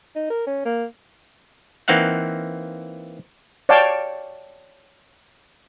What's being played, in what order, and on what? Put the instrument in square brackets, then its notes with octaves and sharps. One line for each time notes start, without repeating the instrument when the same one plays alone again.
[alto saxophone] D#4
A#4
C#4
A#3
[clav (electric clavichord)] E3 A#3 C4 D#4 F5 F#5
[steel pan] C#5 D5 F5 G5 A5